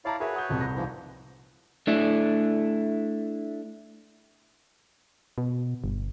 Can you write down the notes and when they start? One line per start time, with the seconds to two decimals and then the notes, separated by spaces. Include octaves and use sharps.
0.05 E4 C#5 D5 F5 A5 A#5
0.20 F#4 G#4 A#4 B4 C#5 E5
0.34 F#5 D#6 G6
0.50 D#1 F2 C3
0.61 C2 A#6
0.76 G#2 E3 F3
1.87 A3 D4 E4
5.38 B2
5.84 G1